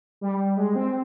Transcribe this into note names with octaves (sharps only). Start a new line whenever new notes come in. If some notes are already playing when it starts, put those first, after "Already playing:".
G3
G#3
C4